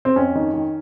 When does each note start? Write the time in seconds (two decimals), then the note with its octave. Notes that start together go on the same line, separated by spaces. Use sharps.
0.05 C4
0.16 F2 C#4
0.35 D#3
0.54 D#3